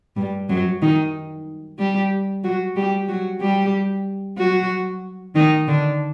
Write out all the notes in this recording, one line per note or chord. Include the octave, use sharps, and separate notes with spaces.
G2 G3
F#2 F#3
D#3 D#4
G3 G4
F#3 F#4
G3 G4
F#3 F#4
G3 G4
F#3 F#4
D#3 D#4
D3 D4